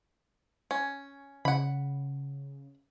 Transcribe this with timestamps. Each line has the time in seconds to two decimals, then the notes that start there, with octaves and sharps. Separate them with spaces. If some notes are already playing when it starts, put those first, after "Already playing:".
0.71 C#4
1.45 C#3 F#5 B5